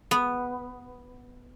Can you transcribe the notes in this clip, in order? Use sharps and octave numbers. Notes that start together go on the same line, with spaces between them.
B3